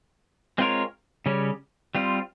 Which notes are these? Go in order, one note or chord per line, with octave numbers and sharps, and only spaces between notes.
G#3 C4 F4 A#4 C#5
C#3 G3 C#4
G3 C4 F4